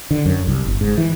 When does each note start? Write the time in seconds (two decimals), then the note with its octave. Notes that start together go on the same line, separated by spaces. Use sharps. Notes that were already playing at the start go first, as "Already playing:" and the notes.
0.11 D3
0.26 F#2
0.47 C2
0.67 G1
0.81 G#2
0.98 E3